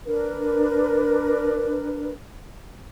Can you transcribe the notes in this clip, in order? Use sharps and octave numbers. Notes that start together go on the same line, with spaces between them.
D4 A#4 B4